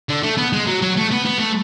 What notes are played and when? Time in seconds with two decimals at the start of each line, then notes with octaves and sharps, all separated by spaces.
0.09 D3
0.23 A3
0.37 B3
0.53 G#3
0.67 F#3
0.82 F#3
0.97 A3
1.11 B3
1.25 B3
1.38 A3